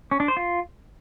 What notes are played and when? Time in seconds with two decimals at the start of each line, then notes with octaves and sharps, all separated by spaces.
0.11 C#4
0.20 D4
0.28 C5
0.37 F4